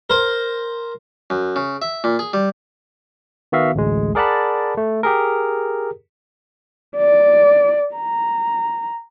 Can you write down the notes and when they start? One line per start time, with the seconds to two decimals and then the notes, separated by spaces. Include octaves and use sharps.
0.10 A#4 C5
1.30 F#2
1.56 C#3
1.82 E5
2.04 A#2
2.19 G#4
2.33 G3
3.52 D#3 B3 F#4 E5 F5
3.75 A1 D2 G#3
4.15 G#4 A#4 D5 F#5 A5 B5
4.77 A3
5.03 G4 G#4 A#4
6.97 D5
7.96 A#5